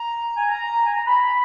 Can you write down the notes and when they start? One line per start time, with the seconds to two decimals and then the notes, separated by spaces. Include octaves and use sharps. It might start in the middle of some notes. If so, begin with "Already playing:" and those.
Already playing: A#5
0.37 G#5
0.49 A#5
0.85 G#5
0.95 A#5
1.07 B5